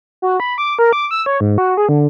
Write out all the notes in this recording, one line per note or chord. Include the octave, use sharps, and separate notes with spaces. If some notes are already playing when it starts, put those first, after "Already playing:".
F#4
B5
D6
A#4
D6
E6
C#5
G#2
F#4
G#4
D3